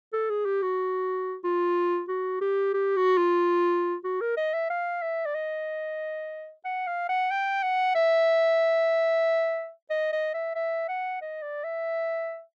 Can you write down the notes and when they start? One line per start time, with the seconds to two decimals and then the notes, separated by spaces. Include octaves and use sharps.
0.13 A4
0.30 G#4
0.46 G4
0.62 F#4
1.44 F4
2.08 F#4
2.41 G4
2.74 G4
2.97 F#4
3.17 F4
4.04 F#4
4.21 A#4
4.37 D#5
4.53 E5
4.70 F5
5.02 E5
5.26 D5
5.35 D#5
6.65 F#5
6.87 F5
7.09 F#5
7.31 G5
7.63 F#5
7.95 E5
9.90 D#5
10.12 D#5
10.34 E5
10.55 E5
10.88 F#5
11.22 D#5
11.42 D5
11.64 E5